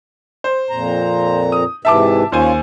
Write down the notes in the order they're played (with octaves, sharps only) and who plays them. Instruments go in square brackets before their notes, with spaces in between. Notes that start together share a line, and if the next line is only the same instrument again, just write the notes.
[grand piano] C5
[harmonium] F2 A#2 A#5
[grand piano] D#6
[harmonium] G#2 C3 E3 [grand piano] E5 A5 D6
[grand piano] D#2 C5 G#5 [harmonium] C#4 F4